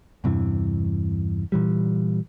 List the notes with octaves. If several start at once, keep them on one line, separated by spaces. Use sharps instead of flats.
E2 G2 C3 E3
A#2 E3 G3